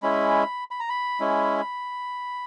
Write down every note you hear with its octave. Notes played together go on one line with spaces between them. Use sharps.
G#3 C#4 E4 B5
B5
A#5
B5
G#3 C#4 E4